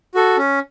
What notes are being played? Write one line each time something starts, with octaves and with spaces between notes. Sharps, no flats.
F#4 A4
C#4